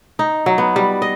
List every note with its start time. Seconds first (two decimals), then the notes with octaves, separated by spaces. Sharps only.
0.19 D#4
0.46 F#3
0.58 B3
0.76 G3
1.02 D#5